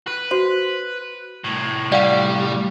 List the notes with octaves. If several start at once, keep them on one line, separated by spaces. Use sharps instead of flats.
B4
F#4 C5
C2 A2
G3 D5 F5 F#5